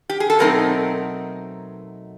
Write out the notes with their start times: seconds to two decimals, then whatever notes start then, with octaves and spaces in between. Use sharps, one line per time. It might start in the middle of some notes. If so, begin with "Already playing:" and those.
0.10 G4
0.20 G#4
0.30 A4
0.39 B2 F#3 A3 C4 D#4 A#4